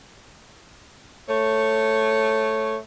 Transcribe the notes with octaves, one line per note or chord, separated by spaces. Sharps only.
A3 C#5